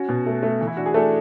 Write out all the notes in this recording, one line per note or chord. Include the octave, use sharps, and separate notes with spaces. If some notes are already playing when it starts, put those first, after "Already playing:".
Already playing: C#4 F#4
B2
A3
A3
E3
E4
D4 F#4
G#4
A3 D4 A4